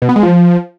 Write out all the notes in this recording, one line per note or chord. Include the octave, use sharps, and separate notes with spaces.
B2
B3
G#3
F3